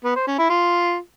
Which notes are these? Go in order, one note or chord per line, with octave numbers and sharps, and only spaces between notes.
B3
C5
C#4
E4
F4